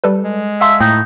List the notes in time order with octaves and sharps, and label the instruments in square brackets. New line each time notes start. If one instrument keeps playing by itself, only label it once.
[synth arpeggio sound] G3 A4 B4
[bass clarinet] G#3
[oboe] E5 [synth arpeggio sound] F5 A5 C6
[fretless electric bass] A2 [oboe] D#4 [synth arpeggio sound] G5